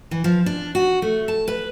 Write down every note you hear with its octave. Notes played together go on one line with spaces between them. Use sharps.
E3
F3
D4
F#4
A3
A5
B4